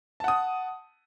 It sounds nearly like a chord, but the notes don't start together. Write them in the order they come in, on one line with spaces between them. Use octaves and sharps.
A5 F#5 D#6